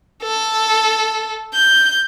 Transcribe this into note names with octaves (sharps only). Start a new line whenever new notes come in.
A4
G6